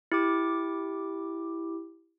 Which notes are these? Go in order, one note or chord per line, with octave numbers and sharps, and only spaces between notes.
E4 G4 D6